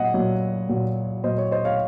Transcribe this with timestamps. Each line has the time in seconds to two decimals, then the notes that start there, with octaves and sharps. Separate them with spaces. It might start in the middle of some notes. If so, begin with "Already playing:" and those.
Already playing: A#2 F#3 D#5 F#5
0.14 A#2 F#3
0.69 A#2 F#3
1.24 A#2 F#3 C5 D#5
1.38 C#5
1.51 C5 D#5
1.65 C#5 F5